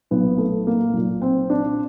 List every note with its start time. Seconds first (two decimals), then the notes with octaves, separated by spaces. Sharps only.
0.11 B1 A#2 B3
0.38 A3
0.67 A#3
0.94 B1 A#2
1.22 C4
1.50 D4